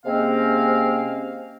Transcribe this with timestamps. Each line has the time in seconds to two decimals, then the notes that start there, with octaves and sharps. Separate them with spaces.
0.05 C3 G#3 A#3 C4 C#4 F5